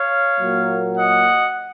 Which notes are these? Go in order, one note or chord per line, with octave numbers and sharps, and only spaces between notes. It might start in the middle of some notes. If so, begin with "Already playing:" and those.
Already playing: C#5 F5
A#2 F#3 A#3
D#5 F#5